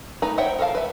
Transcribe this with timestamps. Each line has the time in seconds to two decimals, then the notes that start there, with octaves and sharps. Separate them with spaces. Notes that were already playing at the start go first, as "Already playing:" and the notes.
0.22 A3 D#4 B4 A#5
0.38 C5 C#5 E5 F#5 G5
0.59 A4 A#4 D#5 F5 A5
0.75 B4 E5